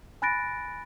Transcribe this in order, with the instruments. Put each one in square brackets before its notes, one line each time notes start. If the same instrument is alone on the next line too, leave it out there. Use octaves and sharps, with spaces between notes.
[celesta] G#5 B5 F#6 A6 A#6 D7